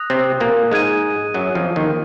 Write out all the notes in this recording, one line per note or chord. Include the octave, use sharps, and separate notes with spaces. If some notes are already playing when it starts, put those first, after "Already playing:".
Already playing: D#6 F#6 A#6 F7
C3 C4
A#2 A#3
G#2 G#3 D#6 G#6 D#7
F#2 F#3
F2 F3
D#2 D#3